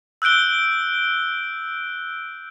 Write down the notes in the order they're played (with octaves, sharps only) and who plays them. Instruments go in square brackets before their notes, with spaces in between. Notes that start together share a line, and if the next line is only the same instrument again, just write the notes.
[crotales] E6 F#6 G6 D7 G7